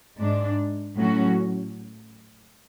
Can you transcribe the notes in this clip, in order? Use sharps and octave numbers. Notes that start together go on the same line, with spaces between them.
G#2 G#3 D4
A2 F#3 C#4 F#4